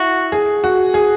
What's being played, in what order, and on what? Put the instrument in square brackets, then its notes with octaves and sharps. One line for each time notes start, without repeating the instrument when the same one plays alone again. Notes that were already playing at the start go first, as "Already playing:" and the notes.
Already playing: [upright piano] E4 [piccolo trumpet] F#4
[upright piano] G#4
F#4
G#4